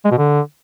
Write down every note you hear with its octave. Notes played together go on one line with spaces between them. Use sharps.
G#3
B2
D3